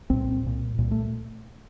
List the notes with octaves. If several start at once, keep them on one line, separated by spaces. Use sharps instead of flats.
C2 A#2 C4
C2 A#2
C2 A#2
A3